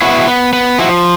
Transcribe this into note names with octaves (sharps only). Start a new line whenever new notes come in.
B3 E4 F#4
B3
B3
F3 E4 F#4